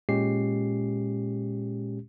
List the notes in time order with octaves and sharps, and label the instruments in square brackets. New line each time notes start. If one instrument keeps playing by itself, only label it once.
[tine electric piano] A#2 G#3 C#4 G4 C7